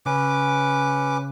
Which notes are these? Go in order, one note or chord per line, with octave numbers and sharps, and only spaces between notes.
C#3 C#4 B4 D6